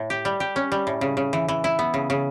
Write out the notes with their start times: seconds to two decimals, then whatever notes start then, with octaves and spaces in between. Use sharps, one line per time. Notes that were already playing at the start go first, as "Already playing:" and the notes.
Already playing: A2
0.10 G4
0.25 G3
0.40 G4
0.56 C#4
0.72 G3
0.87 A2
1.01 C#3
1.17 C#3
1.33 E3
1.48 E3
1.64 E4
1.79 B3
1.94 C#3
2.10 C#3